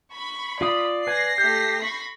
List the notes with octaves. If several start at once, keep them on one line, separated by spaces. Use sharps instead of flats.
B5 C#6
F4 D5 F5 D#6
B4 G#5 A#6 C7
A3 G4 G6
B5 C#6